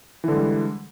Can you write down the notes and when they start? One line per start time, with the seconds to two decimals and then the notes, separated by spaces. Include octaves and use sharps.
0.24 E3
0.28 D3
0.32 G#3
0.37 G3